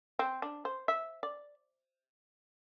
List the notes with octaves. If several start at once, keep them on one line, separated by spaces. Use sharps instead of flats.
C4
D4
C5
E5
D5